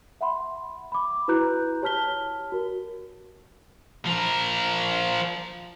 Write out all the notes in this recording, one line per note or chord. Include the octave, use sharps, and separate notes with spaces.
E5 F#5 B5 C6
B5 D6
E4 F#4 B4 A#5 F#6 G6
G4 C#5 A5 F6 B6 G7
F#4 A#4
F3 A#4